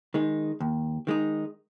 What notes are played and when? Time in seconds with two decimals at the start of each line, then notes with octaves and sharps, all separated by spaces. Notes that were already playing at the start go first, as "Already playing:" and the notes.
0.14 D#3 G#3 D#4
0.60 D#2
1.07 D#3 G#3 D#4